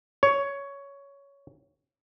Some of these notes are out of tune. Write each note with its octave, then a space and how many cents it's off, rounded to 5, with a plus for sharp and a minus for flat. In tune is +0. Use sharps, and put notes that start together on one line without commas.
C#5 +10